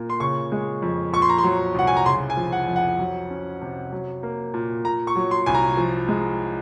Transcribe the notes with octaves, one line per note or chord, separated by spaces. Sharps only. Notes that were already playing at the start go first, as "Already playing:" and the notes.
Already playing: A#2 A#3
C6
C#3 C#6
G#3
F2
A#2 C#6
C6
A#5
C6
F#3
C2 F#5
G#5
A#5
C#3 C6
G#5
F3
F#5
F2
F#5
F#3
C#4
C3
F#3
A#3
A#2
A#2 A#5
C#6
F#3
C6
C2 G#5
A#5
F3
G#3